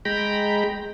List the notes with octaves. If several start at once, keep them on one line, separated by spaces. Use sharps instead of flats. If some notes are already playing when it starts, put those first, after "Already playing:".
G#3 G5 A#5 B5